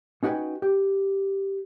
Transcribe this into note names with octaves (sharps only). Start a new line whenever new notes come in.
C#4 D#4 F#4 B4 G5 G#5
G4